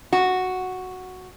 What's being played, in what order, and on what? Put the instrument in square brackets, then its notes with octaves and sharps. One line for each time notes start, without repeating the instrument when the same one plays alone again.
[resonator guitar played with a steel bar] F#4